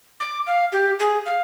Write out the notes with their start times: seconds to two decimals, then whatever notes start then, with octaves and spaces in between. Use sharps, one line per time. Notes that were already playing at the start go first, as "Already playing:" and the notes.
0.20 D6
0.47 F5
0.72 G4
0.99 G#4
1.26 F5